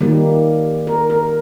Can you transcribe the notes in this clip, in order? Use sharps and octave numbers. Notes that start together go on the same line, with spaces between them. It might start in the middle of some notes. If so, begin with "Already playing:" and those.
D#3 G3 A#3
A#4
A#4